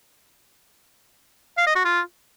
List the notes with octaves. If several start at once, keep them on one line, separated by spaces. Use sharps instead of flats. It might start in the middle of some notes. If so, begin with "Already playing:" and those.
F5
D#5
F#4
F4